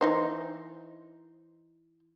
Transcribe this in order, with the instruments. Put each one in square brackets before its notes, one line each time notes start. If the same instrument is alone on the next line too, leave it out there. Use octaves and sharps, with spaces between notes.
[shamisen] E3 D#4 C5